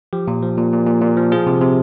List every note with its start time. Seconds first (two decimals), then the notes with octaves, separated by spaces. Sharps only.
0.13 F3 G4
0.28 A#2
0.42 F3
0.57 A#2
0.73 A#2
0.87 A#2
1.02 A#2
1.17 F3
1.32 F3 G#4
1.47 C3
1.61 C3